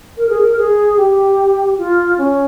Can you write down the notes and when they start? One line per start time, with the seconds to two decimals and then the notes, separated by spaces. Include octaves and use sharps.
0.18 A#4
0.29 G#4
0.41 A#4
0.58 G#4
0.97 G4
1.78 F4
2.18 C#4